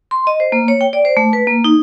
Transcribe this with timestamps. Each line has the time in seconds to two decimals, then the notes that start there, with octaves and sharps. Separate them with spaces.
0.11 C6
0.27 D#5
0.40 C5
0.52 A#3
0.68 C#5
0.81 G5
0.93 D5
1.05 C5
1.17 A3
1.33 B4
1.47 A#3
1.64 D#4